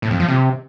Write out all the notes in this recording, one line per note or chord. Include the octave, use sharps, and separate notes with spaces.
A2
F2
F3
C3